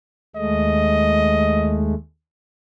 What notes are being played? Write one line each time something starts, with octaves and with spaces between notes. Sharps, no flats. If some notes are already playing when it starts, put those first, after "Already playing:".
D#2 G#3 A3 D#5